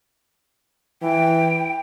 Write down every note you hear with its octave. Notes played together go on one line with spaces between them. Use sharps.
E3 G5